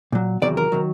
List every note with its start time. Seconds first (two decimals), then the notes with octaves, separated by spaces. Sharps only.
0.12 A#2 F#3
0.42 E2 C3 D#3 F#3 D5
0.57 A#4
0.72 C3 D#3 F#3